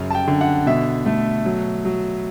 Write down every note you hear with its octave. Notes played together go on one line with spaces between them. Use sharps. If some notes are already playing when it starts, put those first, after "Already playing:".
Already playing: F#2 C#3
A5
G5
D3
F#5
B2 E5
A3
F#3
F#3